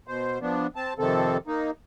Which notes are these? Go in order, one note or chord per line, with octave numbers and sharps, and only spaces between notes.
B2 C5
F3 B3 D4
C4 A5
F2 C3 D#3 C4 A4
A#3 D#4